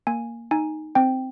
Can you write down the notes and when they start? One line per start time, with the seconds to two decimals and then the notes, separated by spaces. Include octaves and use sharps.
0.07 A#3 G#5
0.51 D#4 G#5
0.95 C4 G5